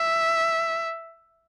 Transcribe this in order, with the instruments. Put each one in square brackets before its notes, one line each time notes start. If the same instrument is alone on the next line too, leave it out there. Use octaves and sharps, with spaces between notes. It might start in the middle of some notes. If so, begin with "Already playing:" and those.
Already playing: [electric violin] E5